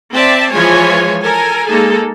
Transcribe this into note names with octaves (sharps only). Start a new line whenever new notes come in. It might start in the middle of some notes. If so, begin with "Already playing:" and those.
C4 D5 E5 A5
E3 F3 G#3 F4 C#5 G#5
A4 A#4 G#5
G#3 A#3 D#4 G#4 A4